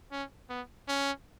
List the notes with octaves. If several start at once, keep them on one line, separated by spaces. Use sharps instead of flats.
C#4
B3
C#4